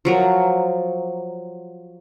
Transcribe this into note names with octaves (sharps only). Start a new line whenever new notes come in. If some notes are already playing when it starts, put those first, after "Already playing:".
F3 F#3 A#4